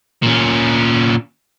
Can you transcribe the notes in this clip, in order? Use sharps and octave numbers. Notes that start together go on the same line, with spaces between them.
A#2 C#4